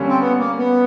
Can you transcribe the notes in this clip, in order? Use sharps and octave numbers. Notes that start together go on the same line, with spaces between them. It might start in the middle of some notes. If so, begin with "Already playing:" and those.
Already playing: D3 G3 A#3 C#4
C4
B3
A#3
B3